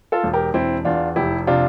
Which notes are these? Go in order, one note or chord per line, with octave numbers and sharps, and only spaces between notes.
F4 A4
E1
G4 A#4
E1 C4 E4
E2 D4 F4
F1 E4 G4
C3 D4 F4